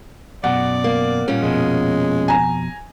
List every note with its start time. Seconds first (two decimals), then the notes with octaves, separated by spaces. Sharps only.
0.44 F#2 B2 D5 F#5
0.84 A#3
1.28 A#2 G3 C#4
1.41 F2 B2 G#3
2.28 G#5 A#5